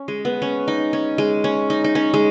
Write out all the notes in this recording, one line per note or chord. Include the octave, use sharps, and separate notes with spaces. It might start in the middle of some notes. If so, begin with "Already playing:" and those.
Already playing: C#4
G#3
B3
C#4
D#4
C#4
G#3
C#4
D#4
D#4
C#4
G#3